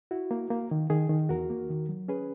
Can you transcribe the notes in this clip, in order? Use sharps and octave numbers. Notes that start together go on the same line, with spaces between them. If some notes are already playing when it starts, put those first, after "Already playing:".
E4 F#4
A#3
A#3
D#3
D#3 G#4
D#3
E2 F#4 A#4
A#3
D#3
F#3
C#4 G#4 B4